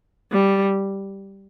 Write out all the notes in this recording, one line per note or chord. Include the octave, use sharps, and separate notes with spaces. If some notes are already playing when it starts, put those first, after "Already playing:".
G3